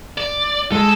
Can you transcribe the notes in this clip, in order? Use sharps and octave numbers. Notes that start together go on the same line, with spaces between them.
D5
G#3 A4